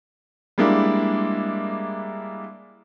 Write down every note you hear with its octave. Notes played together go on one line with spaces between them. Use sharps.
G3 G#3 A#3 D4 E4